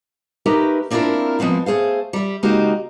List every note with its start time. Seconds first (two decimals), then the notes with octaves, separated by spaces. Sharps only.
0.46 A3 D#4 G4 A#4 B4
0.90 A#3 C4 D4 E4 F4 A#4
1.39 F3 G#3 B3 C4 E4
1.66 A3 G#4 C5 F5
2.13 G3 E5
2.43 C#3 G#3 A#3 D#4 F#4 G4